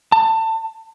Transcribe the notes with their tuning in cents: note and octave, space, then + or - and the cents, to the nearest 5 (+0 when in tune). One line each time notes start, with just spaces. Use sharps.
A5 +25